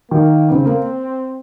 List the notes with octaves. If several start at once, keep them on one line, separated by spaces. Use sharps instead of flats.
D#3 A#3
C#3 C4
A#3